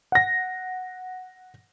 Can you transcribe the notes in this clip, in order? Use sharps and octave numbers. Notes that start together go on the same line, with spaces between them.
F#5 A#6